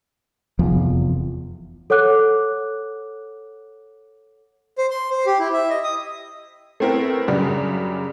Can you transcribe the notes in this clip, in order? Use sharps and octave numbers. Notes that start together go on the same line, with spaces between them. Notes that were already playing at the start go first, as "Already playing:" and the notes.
F1 E2 F3
A4 C#5 F#5 D6 F#6
C5
C6
C5
G4
E4
E5
D#5
D#6
A3 B3 C4 E4 A#4
F#2 C#3 G3 D4